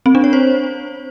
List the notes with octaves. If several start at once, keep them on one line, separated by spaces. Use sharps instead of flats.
C4
D4
C#5
C5